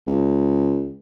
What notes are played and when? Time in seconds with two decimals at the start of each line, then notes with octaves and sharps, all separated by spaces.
0.07 C#2